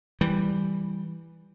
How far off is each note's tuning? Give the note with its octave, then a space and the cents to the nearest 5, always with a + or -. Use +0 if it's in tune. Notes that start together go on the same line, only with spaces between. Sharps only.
E3 +0 G3 +0